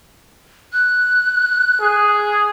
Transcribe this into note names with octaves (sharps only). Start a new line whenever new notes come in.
F#6
G#4